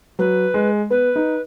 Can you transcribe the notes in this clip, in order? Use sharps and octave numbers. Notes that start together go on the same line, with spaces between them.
F#3 B4
G#3
B3 B4
D#4